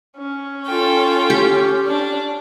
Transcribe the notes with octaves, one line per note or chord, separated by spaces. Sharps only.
C#4
F4 A4 G5
G4
D4